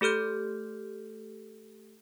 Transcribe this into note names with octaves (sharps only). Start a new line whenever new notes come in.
A3 G4 A4 F6 G6